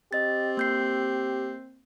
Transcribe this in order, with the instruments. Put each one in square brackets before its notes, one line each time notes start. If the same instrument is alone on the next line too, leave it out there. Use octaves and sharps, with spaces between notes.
[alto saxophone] C4 [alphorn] G4 [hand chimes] D#5 A6
[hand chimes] A#3 G6 C7